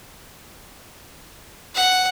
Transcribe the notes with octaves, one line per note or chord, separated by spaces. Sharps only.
F#5